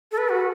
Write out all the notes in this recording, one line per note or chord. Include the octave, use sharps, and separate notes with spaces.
A4
B4
F#4